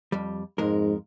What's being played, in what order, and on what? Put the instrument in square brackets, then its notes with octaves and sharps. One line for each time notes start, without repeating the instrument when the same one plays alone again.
[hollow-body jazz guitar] F2 G3
[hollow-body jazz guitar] F2 G#3 A#4 [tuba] G#2